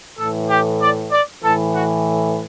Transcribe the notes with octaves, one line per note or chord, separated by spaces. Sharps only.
A2 E3 A4
G4
D5
D5
A2 E3 A4
F#4